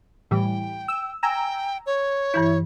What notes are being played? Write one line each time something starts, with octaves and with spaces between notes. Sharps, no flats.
A2 E3 G3 G5
E6
G5 G#5 A#5 E6
C#5
G2 E3 E4 G6